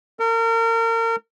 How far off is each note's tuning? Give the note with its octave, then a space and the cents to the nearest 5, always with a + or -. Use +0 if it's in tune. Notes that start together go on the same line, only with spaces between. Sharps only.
A#4 -35